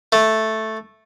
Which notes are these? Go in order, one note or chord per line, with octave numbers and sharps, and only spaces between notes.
A3